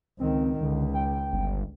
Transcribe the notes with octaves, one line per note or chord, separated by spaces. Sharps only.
C#2 D#3 C4
C#2 D3
G5
G1